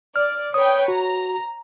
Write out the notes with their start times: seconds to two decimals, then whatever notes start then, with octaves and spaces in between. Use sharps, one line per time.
0.16 D5 F6
0.54 B4 C#5 G5 D#6
0.88 F#4 A#5